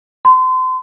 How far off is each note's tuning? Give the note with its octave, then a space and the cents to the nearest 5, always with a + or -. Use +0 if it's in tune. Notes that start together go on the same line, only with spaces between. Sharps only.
C6 -35